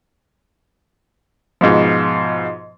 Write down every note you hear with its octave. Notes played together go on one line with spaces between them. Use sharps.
G#2 B2 F3